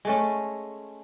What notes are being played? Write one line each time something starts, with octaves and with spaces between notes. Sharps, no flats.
G#3 A3 C#4